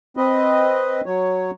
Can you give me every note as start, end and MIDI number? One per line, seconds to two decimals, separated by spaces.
0.17 1.01 60
0.17 1.01 71
0.17 1.01 75
1.06 1.51 54
1.06 1.51 73